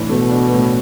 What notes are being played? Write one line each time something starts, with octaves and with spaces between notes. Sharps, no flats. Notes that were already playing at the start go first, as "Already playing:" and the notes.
Already playing: A2 E3 D4
B2 A3
D4
A2